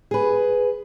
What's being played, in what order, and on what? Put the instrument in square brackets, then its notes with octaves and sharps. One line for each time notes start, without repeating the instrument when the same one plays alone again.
[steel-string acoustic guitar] G#4 B4